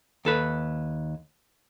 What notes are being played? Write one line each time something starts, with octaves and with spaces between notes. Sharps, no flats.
D#2 A4 B4